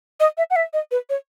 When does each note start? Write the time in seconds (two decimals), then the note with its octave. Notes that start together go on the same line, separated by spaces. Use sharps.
0.20 D#5
0.37 E5
0.50 F#5
0.56 E5
0.73 D#5
0.91 B4
1.09 C#5